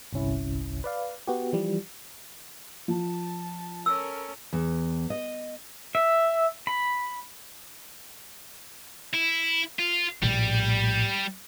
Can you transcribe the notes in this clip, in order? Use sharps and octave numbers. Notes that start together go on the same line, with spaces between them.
G1 C2 C#4 E4
B4 D5 F5
B3 F#4 G4
E3 F3 G3
F3 A5
C#4 A4 A#4 E6
E2
D#5
E5
B5
E4
F4
A#1 A2 G3